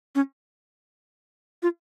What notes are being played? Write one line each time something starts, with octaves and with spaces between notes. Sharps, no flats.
C#4
F4